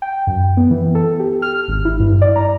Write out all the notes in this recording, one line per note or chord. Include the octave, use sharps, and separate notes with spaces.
G5
F#2
B3
E3
A4
G4
F6
G#1
E4
G2
D5
A#5